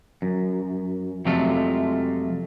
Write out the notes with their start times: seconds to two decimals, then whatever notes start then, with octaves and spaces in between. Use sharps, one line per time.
0.22 F#2
1.25 F2 C3 F#3 G#3 A3 F4